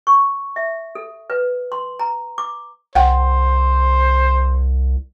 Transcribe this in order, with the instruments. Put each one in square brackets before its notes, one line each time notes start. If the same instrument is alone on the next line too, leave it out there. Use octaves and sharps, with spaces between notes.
[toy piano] C#6
E5
A4
B4
C6
A#5
D6
[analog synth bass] C2 [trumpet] C5 [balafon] F#5 G5